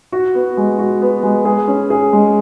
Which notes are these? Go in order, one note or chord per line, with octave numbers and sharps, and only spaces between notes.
F#4
B3
G#3
F#4
B3
G#3
G#4
C#4
G#4
G#3